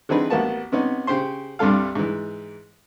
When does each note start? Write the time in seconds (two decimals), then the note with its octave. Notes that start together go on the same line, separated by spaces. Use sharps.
0.09 D3 E3 C4 D#4 G#4 B4
0.30 A1 A#3 B3 F#4 A5
0.72 C3 B3 C#4 D#4
1.07 C#3 G4 C5 C6
1.59 C2 G2 C3 G3 A4 F5
1.95 G#2 E3